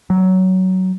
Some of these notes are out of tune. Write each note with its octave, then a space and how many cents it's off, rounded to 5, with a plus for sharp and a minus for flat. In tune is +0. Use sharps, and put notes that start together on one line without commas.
F#3 +15